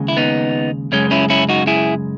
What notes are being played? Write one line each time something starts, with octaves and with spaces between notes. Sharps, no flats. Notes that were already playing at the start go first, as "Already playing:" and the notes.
Already playing: D#2 C#3 G#3
E4
B3 D#4
F#2 C#3 G#3 C#4
C#4 E4
C#4 E4
D#4 F#4
E4 G#4